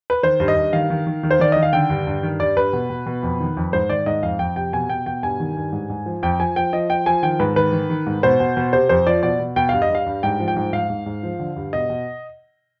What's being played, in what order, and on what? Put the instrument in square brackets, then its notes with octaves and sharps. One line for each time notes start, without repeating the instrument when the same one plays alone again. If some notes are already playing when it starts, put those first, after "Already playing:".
[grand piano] B4
D#3 C5
G2
D#5
G2
D#3 F5
D#3
D#3
D#3
C5
D#3 D5
D#3 D#5
F5
D3 G5
G2
G2
D#3
G2 D5
G2 B4
B2
B2
B2
F2
D#3
F2
G#2 C5
D#3 D5
G#2 D#5
F2 F5
F2 G5
C3 G5
B2 G#5
B2 G5
B2 G5
G2 G#5
D#3
G2
G#2
G#2
F3
F2 G5
F3 G#5
F3 G5
F3 D#5
F3 G5
F3 G#5
D#3 G5
G#2 B4
D#3 B4
D#3
D#3
G#2
B2 C5
B2
B2
C3 C5
F2 C5
F3 D5
B2 D5
B2
B2 G5
G2 F5
D#5
G2
F5
G2
G#2 G5
F3
G5
G#2
G#2 F5
G#2
G#2
F3
D3
G2
B2 D#5
B2